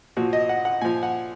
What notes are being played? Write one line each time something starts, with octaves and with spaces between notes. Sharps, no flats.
A#2 F3 F#4
D#5
F#5
F#5
A#2 F3 G#5
F#5